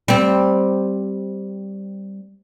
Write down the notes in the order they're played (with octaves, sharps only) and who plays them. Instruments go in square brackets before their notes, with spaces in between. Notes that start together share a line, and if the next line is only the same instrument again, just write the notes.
[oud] G3 C4